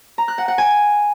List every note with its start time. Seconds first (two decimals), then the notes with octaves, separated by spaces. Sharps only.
0.18 A#5
0.28 F#6
0.38 F#5
0.48 F#5
0.58 G#5